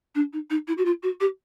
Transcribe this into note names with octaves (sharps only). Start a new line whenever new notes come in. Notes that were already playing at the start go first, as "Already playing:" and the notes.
D4
D#4
D#4
E4
F#4
F4
F#4
G4